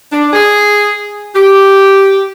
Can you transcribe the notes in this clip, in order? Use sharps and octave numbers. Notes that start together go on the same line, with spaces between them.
D4
G#4
G4